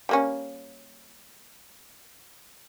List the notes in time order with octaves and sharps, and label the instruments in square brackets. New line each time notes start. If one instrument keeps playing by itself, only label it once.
[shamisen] G3 A#3 C#4